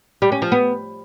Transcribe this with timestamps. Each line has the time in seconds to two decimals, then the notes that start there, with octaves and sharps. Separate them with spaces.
0.22 G3
0.32 C#4
0.42 F3
0.52 B3